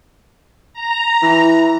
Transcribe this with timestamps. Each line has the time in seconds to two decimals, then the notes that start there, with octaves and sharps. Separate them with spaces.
0.73 A#5
1.23 E3